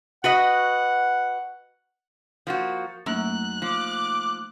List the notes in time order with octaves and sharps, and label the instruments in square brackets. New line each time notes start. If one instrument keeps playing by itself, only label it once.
[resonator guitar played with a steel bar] F#4 B4 D#5 [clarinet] F#5
[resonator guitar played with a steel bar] F3 A#3 F#4 [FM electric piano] G6 A6 C#7
[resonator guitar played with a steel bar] F#2 [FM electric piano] A3 A#3 D#4 [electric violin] F#6
[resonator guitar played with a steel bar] F3 [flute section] D6